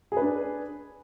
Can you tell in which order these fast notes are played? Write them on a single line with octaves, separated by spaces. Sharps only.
G#4 B4 D4